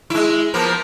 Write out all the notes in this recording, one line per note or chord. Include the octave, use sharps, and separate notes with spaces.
G#3 E4
F3 A#3 B3